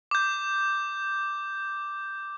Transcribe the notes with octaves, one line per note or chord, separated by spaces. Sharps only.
D6 G6